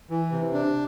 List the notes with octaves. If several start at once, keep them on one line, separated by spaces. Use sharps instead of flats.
E3
C3
D4